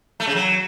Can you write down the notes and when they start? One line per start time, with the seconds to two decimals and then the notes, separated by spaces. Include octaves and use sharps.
0.20 A3
0.27 C#3
0.35 F#3